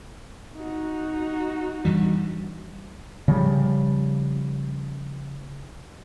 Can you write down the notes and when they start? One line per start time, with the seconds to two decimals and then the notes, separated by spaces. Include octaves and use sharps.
0.55 D#4 F#4
1.85 G2 E3 G3
3.28 C#3 F3 G3